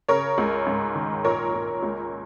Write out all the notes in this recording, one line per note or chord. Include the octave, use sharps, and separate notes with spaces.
C#3 A#4 C#5
C#2
G#2
D#3
A#2 A#4 C#5
A#2
C#2